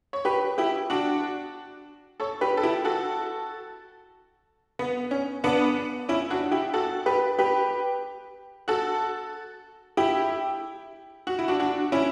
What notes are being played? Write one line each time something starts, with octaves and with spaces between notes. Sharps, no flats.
C#5
G4 B4
E4 G4
D4 F#4
A4 C#5
G4 B4
A4
E4 G4
F#4 A4
B3
C#4
B3 D4
C#4 E4
D4 F#4
E4 G4
F#4 A4
G4 B4
G4 B4
F#4 A4
E4 G4
F#4
E4
D4 F#4
D4 F#4
C#4 E4